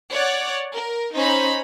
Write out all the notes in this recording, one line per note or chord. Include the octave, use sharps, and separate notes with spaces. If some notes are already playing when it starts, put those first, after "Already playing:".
C#5 D5 F#5
A#4
C#4 D#4 C5 A#5 B5